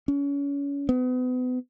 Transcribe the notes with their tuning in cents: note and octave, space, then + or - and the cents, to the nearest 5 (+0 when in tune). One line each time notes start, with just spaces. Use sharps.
C#4 +30
B3 +35